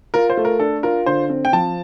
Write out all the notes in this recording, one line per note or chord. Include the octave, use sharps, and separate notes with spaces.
F4 A#4
C5
A3
A#4
D4 A4
F4 A#4
D3 C5
C4
G5
F3 A5